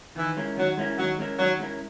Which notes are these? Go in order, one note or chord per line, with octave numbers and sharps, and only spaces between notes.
D#3 E3
G#3 C#4 E4 A#4
D#3 F#3
G#3 C#4 E4 A#4
D#3 F#3
G#3 C#4 E4 A#4
D#3 F#3
G#3 C#4 E4 A#4